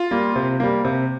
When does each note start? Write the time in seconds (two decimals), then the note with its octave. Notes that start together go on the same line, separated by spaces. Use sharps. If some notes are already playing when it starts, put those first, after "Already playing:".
Already playing: F4
0.11 G3 A#3
0.36 C3
0.60 G3 A#3
0.85 C3